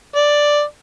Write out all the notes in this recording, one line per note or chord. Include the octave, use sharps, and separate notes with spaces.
D5